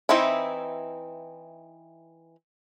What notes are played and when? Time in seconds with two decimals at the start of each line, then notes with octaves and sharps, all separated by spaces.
0.09 E3 C4 D#4 E4